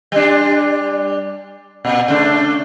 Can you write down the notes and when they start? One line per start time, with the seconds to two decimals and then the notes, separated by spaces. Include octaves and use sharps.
0.12 G3 D4
1.85 A#2
2.08 C#3 A3 D4